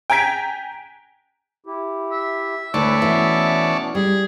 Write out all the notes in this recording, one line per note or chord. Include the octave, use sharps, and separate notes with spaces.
G5 G#5 A#5 G#6 B6 D7
E4 G4
E5
D2 E4 B4 C#5 D5 A5
B2 E3 B3 C#4
G3 G#4